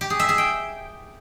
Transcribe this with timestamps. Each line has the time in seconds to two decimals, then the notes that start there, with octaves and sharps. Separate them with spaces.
0.01 G4
0.10 G#4
0.19 E5
0.29 G#4
0.38 G5